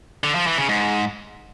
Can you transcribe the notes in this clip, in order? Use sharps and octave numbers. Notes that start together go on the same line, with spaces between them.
D3
F3
E3
C#3
G#2